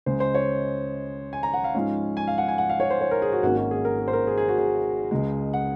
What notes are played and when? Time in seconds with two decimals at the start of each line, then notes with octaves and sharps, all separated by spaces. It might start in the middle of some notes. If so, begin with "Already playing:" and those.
0.06 C#2 C#3 G#3 C5
0.20 C5
0.35 C#5
1.33 G#5
1.43 A#5
1.54 F#5
1.64 F5
1.75 G#2 F3 G#3 C#4
2.17 G#5
2.27 F5
2.38 F#5
2.48 G#5
2.58 F#5
2.70 F5
2.80 C#5
2.90 C5
3.01 C#5
3.11 A#4
3.22 G#4
3.32 F#4
3.43 G#1 G#2 D#3 A#3 C#4 F#4
3.57 F#4
3.71 G#4
3.85 A#4
3.99 G#4
4.08 C5
4.13 A#4
4.27 G#4
4.38 G#4
4.48 F#4
4.59 G#4
5.11 C#2 C#3 G#3
5.54 F#5